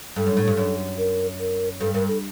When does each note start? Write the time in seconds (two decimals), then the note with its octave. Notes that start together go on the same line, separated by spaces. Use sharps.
0.16 G2 A4
0.26 F#2
0.37 A2
0.48 G2
0.57 F#2
0.98 A#4
1.40 A#4
1.80 G2 A4
1.94 G2 A#4
2.08 A4